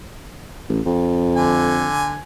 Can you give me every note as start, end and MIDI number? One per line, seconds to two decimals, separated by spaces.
0.69 0.81 33
0.86 1.90 41
1.35 2.20 50
1.35 2.20 80